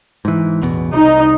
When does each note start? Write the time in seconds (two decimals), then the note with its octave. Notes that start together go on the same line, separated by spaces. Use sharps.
0.25 G#2 E3
0.62 A1 E2 B2
0.93 C2 D#4